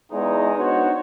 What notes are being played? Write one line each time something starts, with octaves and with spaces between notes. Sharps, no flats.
E2 G#3 D#4
B3 D4 D#4 F#4 C5 C#5